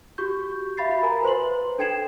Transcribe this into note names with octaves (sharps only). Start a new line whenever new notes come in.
F#4 G4 C#6 G6
E5 F5 B5 A6 C7
F#4 B5
A#4 G#5 A#5
B4 C5 C6 F#7
D4 A4 G5 G#6 C7 E7